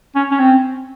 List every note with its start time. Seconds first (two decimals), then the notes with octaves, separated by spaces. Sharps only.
0.15 C#4
0.31 C#4
0.39 C4